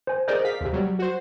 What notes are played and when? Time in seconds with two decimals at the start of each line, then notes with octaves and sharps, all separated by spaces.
0.07 C5 G#5
0.28 G#4 A#4 C5 D5 D#5 G6
0.45 G#4 F5 B6
0.61 D#2 C3
0.73 F#3 G3
0.99 F#4 C5